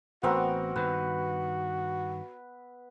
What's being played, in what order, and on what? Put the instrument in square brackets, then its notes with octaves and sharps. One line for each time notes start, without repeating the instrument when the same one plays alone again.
[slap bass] A1 [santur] B3 C4 A#4 [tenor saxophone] F#4
[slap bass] G2 D#3 [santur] B4